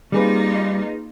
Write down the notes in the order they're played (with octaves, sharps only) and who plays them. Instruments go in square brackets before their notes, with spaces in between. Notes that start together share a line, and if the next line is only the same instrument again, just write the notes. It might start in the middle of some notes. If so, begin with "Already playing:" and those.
[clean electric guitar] G3 [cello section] A#3 D#4 F4 [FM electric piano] C4 G#4 B4